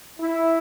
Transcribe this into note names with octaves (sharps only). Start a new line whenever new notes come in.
E4